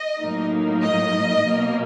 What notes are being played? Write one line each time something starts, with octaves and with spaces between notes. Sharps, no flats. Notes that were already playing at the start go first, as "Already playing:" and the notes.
Already playing: D#5
A2 F#3 A#3 D#4
D#5
B2 F#3 A#3